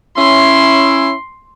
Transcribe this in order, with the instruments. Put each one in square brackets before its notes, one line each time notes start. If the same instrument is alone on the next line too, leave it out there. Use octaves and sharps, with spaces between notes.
[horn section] C#4 E4 [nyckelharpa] C6